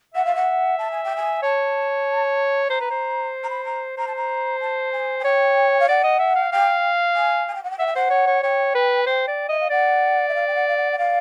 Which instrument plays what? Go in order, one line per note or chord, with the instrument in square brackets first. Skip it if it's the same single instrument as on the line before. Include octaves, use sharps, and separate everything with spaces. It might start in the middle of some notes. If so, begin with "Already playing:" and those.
[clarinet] E5 [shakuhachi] F#5
[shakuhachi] F5
F#5
A5
G#5
G5
G#5
[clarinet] C#5 [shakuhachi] A5
[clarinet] C5 [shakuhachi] A#5
[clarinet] B4
C5
[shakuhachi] A#5
B5
A#5
[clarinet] C5 [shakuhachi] A#5
[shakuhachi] A5
A#5
A5
G#5
G#5
[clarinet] C#5 [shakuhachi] G5
[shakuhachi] F5
[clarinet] D5 [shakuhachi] F#5
[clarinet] D#5
E5
F5
[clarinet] F5 [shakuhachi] G5
[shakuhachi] G#5
G#5
G5
F#5
G5
[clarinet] E5 [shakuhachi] F#5
[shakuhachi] G5
[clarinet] C5 [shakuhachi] F#5
[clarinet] C#5
C#5
[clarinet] C#5 [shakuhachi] G5
[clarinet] B4
[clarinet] C5 [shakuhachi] G5
[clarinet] D5
[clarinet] D#5 [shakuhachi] E5
[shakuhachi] F5
[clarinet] D5 [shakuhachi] F#5
[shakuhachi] E5
F5
G5
F#5
F5
F#5
F#5
[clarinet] D5 [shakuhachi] F5